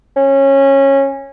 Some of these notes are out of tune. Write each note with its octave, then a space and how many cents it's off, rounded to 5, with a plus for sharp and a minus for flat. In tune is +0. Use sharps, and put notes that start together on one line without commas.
C#4 -20